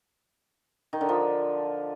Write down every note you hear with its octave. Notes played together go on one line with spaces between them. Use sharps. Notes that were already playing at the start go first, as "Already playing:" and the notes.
D#3
D3
F3